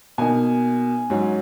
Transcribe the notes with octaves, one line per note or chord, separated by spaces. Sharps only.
B2 A#3 D#4 G#5
G#2 F#3 C#4